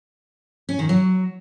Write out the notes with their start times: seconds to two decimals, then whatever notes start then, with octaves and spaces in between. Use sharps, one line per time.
0.69 C#4
0.79 D#3
0.89 F#3